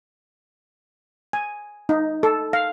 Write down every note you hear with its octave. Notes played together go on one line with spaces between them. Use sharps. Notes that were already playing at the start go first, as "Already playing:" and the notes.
G#5
D#4
A4
F5